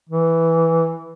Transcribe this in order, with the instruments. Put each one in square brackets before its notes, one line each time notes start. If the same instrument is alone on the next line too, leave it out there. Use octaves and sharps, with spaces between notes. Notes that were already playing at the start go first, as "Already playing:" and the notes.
[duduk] E3